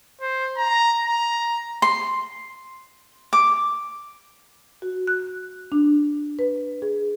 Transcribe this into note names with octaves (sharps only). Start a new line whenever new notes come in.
C5
A#5
A#5
C6
D6
F#4
F#6
D4
B4
G#4